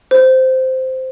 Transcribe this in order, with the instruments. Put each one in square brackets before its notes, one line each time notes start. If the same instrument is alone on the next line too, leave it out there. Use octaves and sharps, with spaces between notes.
[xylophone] C5